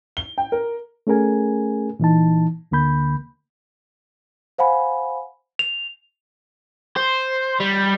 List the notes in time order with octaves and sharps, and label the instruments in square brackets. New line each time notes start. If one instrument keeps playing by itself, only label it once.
[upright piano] G7
G5
A#4
[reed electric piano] A3 C#4 G#4 A#4 G#5
A#2 E3 D#4 A5
D2 D3 A#3 B5 G6
[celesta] C5 F5 F#5 G#5 B5
[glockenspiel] F7
[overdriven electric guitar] C5
G3